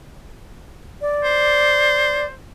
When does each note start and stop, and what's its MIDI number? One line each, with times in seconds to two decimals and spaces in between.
1.01 2.25 74
1.24 2.34 72